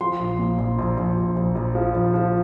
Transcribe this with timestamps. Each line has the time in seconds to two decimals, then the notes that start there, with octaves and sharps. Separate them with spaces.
0.01 F3 C6
0.20 A#1
0.39 A#2
0.58 A#1
0.78 A#1
0.97 A#1
1.17 A#1
1.37 A#1
1.55 A#1
1.75 F3
1.94 A#1
2.14 F3